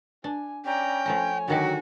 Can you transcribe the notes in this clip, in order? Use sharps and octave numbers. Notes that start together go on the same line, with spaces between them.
D4 G#5
C#4 D5 G5 A#5
F3 A3 C#5 G#5 A#5
D3 D#3 F#3 F#4 G4